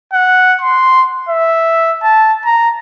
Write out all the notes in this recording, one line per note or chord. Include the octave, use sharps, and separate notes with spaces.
F#5
C6
E5
A5
A#5